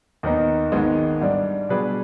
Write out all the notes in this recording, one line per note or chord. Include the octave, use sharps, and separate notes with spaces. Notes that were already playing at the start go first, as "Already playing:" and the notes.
D#2 D#3 B3 D#4
G#1 G#2 D#3 G#3 B3
G#2 G3 D4
B2 G3 D4 G#4 B4